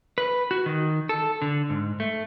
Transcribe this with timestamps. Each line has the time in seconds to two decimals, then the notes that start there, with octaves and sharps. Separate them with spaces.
0.18 B4
0.51 F#4
0.66 D#3
1.09 A4
1.42 D3
1.70 G#2
2.00 A3